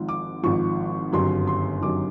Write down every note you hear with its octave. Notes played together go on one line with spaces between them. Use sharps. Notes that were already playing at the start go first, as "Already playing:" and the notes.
Already playing: G#1 G#2 F3
D6
G#1 G#2 F3 C#6
G1 F#2 D#3 F#3 C6
C6
G1 F#2 D#3 F#3 D6